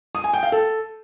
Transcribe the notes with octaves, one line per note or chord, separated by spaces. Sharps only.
D#6
G#5
G5
F5
A4